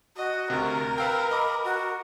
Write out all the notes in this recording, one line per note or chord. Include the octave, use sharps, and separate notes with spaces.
F#4 D#5
D2 C3 A#4
B4 F5 G5 E6
D#5 B5 D6
F#4